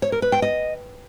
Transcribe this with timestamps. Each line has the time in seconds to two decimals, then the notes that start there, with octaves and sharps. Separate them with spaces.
0.02 C#5
0.12 A#4
0.22 B4
0.32 G5
0.42 D#5